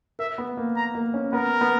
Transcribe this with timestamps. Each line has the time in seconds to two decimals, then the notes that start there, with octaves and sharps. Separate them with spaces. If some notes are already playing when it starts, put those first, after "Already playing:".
0.19 A#4 E5
0.38 B3
0.57 A#3
0.76 A#5
0.95 A#3
1.14 C#4
1.33 B3 A#4
1.61 B3